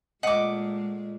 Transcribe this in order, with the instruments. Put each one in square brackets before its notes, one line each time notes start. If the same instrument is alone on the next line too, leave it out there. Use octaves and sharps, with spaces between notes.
[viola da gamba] A#2 G#3 [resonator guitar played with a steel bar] A3 D#5 [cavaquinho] F#5 D6